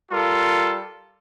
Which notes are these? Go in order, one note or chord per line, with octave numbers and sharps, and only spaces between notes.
G3 F4 A4 A#4